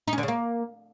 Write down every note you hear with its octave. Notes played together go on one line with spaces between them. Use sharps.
D#4
C#4
D3
C#3
A#3